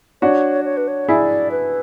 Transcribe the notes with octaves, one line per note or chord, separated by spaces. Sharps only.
D4 F#4 C#5
C#5
B4
C#5
E4 G#4 D5
B4